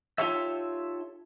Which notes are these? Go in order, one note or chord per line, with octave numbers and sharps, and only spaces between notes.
D#4 F4 G4 A4 C#5 E5